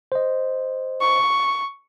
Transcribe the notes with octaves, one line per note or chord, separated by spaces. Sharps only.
C5 D#5
C#6